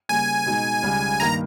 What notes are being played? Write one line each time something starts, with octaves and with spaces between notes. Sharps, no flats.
C#3 G3 A#3 G#5
B2 G#3 D#4
C#2 C#3 G3
G2 D#3 A#3 A#5